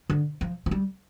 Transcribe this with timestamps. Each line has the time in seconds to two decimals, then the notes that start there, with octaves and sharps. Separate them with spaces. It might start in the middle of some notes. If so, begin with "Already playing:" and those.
0.09 D3
0.41 F3
0.66 F3
0.71 G3